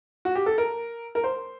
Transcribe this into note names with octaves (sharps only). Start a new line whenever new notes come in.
F#4
G4
A4
A#4
A#4
C5